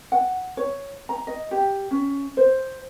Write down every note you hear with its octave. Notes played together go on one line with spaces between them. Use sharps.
F#5
C#5
A#5
D#5
G4
C#4
C5